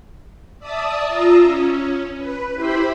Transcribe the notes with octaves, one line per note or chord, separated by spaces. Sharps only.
D5 E5 A5 D#6
F4 A#5 D#6 E6
C#4
B4
E4 G4 C5 B5